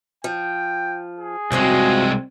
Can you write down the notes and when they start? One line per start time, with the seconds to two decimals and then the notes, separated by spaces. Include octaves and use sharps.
0.24 F3 G5
1.20 G#4
1.52 C2 F#2 F3 G#3 C4 F#4